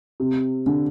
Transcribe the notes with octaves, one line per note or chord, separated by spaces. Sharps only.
C3
D3